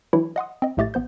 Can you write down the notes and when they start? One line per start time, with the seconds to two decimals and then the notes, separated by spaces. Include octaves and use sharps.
0.13 E3 F#3 D4 E4
0.36 D#5 F#5 C6 D#6
0.62 C4 D#5
0.77 A#1 A2 A3 G4 D#5 A6
0.94 A1 B3 C5 G6